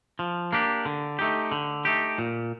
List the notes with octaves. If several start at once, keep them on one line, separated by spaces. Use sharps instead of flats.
F3
A#3 D4 G4
D3
A3 D#4 G4
D3
A3 D#4 G4
A#2